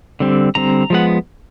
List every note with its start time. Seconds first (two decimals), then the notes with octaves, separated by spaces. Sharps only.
0.20 D3 G3 C4
0.55 D3 G3 C4 A#5
0.90 F3 G#3 B3 F#5